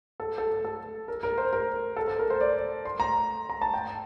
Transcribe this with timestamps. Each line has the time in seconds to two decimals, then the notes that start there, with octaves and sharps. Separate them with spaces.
0.20 A4
0.38 A4
0.65 A4
1.08 A#4
1.23 A#4
1.38 C5
1.53 A#4
1.96 A4
2.08 A4
2.19 A#4
2.30 C5
2.41 D5
2.85 C6
3.00 A#5
3.50 A#5
3.61 A5
3.74 G5